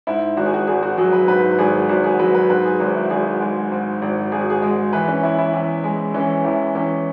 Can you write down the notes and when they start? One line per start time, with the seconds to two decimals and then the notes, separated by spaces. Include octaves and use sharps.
0.07 G#2 E4
0.37 G#1 F#4
0.46 G#4
0.54 F#4
0.67 G#1 G#4
0.83 F#4
0.98 F#3 G#4
1.13 B4
1.28 G#2 B4
1.58 G#1 G#4
1.89 G#1 F#4
2.04 G#4
2.19 F#3 B4
2.34 B4
2.50 G#2 B4
2.65 G#4
2.80 G#1 F#4
2.95 E4
3.10 G#1 G#4
3.41 G#3
3.72 G#2
4.02 G#1
4.32 G#1 G#4
4.41 F#4
4.50 G#4
4.62 G#3
4.93 E3 B4
5.08 C#4
5.23 E2 E4
5.38 E4
5.53 E2
5.84 G#3
6.14 E3 C#4
6.45 E2 E4
6.75 E2 C#4